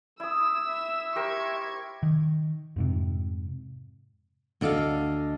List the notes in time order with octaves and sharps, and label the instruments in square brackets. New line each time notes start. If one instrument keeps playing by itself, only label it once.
[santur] E4 D#6 [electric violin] E6
[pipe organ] E5
[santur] G4 A#4 C5 [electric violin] C#6 G#6
[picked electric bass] D#3
F2 G#2 C3
[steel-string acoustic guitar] D2 D4 A4 D#5 F5